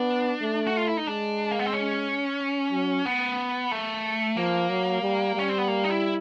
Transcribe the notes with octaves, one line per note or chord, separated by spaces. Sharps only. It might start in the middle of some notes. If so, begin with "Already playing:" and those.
Already playing: B3 D4
A3
F#4
F4
E4
D#4
G#3 D4
A#3
B3
C4
C#4
F#3
B3
A3
F3 A#3
F#3
G3
G3 C#4
C4
B3
A#3
D#4
E4